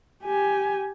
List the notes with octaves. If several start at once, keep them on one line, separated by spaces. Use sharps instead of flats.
G4 G#5